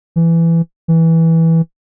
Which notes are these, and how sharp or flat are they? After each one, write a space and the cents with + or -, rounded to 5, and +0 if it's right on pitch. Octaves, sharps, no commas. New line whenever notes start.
E3 +15
E3 -10